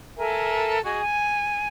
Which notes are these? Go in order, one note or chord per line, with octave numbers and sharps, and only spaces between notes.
A4 A#4 E5 G#5
F#4 G#4 D#5
G#5